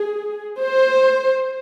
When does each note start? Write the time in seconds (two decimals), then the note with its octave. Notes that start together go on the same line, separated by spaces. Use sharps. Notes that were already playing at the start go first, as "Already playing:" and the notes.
Already playing: G#4
0.60 C5